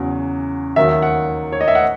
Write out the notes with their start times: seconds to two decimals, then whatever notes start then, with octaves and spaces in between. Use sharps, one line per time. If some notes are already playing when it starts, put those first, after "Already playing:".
Already playing: E2 C#3 F#3
0.76 D#2 D#3 F#3 E5
1.02 F#5
1.52 C#5
1.61 D#5
1.68 E5
1.75 F#5